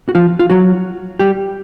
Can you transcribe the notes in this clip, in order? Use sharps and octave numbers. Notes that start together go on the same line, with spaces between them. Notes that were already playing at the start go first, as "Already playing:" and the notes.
F#4
F3 F4
F4
F#3 F#4
G3 G4